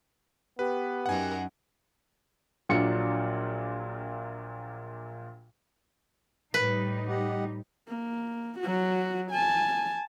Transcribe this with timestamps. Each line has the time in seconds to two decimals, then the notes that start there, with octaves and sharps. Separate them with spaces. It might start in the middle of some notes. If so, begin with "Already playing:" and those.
0.59 B3 G4 B4
1.06 F#2 D#4 A#4 F#5 G#5
2.69 A#1 A#2 F#3 D4 F4 C#7
6.54 A2 G3 D#4 B4
7.08 G4 D#5 F#5
7.88 A#3
8.59 F#3 F#4
9.31 G#5 A5